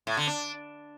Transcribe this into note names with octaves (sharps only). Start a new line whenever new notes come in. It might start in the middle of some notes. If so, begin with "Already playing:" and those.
A2
D3
D4